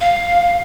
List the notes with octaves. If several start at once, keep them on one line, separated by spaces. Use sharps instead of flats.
F5